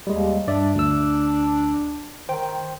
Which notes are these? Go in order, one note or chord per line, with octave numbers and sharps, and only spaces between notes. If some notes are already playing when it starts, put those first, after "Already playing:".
D#2 G3 G#3
G2 D4 D5 E5
D2 E6
D#3 C5 G5